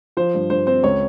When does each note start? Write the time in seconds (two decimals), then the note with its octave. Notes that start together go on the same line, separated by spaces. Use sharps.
0.17 F3 C5
0.34 G2
0.50 G2 C5
0.67 C4 C5
0.83 C#2 C#5